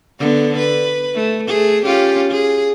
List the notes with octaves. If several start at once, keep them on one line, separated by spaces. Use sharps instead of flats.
D3 B3
B4
A3
A3 G#4
C#4 F4 G4
G#4